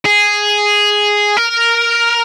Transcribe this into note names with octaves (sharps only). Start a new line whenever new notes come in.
G#4
A#4